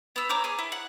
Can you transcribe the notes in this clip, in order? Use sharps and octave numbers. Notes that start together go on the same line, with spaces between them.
B3 E6
C#5 A#5 D6 G6
G#4 G#5
E4
F#5